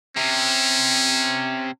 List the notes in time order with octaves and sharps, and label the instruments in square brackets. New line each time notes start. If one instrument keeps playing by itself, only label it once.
[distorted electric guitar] C3 [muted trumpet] C#4